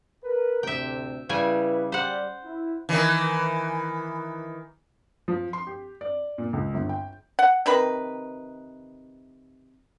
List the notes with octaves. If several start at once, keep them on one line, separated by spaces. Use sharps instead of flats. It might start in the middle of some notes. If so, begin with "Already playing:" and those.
A#4 B4
D2 A2 C3 E5 G5
C#3 G3 E4 B4 G#5
G3 C5 F#5
E4
D#3 E3
F3
C6
G4
D5
A#2
C#2
G1
G5
F#5
C3 D#3 B4 B5